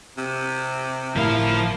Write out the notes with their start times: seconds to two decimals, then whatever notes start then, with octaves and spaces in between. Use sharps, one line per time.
0.17 C3
1.16 G1 A2 F3 A#3 E4 F5